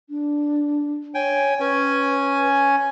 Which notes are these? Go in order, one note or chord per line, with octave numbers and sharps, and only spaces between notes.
D4
C#5 G5 G#5
C#4 B4 G#5